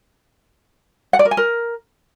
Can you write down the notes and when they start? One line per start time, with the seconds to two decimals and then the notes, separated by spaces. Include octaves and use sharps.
1.13 F#5
1.19 D5
1.25 A#4
1.31 G#5
1.37 A#4